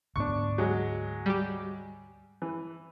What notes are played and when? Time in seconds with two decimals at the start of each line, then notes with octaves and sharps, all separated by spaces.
0.16 D2 G#2 B3 D4 C#6
0.58 F#3 G#3
1.26 G3 G4
2.42 E3